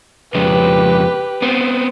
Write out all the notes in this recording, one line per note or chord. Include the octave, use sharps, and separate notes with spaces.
F2 C#3 G#3 G4 B4
B3 C4